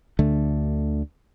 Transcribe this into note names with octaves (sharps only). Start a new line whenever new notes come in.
D2 D3 A3